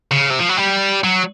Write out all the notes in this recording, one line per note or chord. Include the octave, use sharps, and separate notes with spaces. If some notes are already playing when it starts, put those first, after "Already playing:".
C#3
C3
F3
F#3
G3
F#3